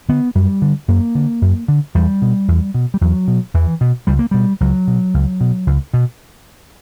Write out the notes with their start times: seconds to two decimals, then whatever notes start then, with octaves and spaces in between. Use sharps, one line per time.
0.09 D3 B3
0.35 F#2 G3
0.62 D3
0.88 F#2 A#3
1.15 D3
1.42 F#2
1.68 D3
1.95 E2 G3
2.22 B2
2.48 E2
2.74 B2
2.94 G3
3.01 E2 F#3
3.28 B2
3.54 E2 E3
3.81 B2
4.07 C#2 G3
4.19 A#3
4.31 B2 G3
4.60 C#2 F#3
4.87 B2
5.14 C#2
5.41 B2
5.67 C#2
5.94 B2